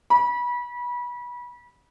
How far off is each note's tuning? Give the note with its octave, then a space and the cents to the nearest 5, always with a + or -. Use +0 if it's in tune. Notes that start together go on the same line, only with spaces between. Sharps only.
B5 -25